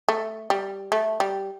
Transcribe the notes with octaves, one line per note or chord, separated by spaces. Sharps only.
A3
G3
A3
G3